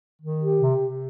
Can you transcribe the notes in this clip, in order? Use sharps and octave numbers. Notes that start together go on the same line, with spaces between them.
D#3
G4
C3
C3